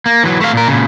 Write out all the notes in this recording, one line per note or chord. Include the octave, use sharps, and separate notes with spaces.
A#3
E3 F#3
A3 F5
A#2 A#4
A#2 C#3